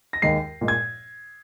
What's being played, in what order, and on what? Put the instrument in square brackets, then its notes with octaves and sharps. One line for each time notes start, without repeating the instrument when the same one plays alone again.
[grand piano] A#6
D#2 D#3 G#3 C7
A#2 G#3
G#6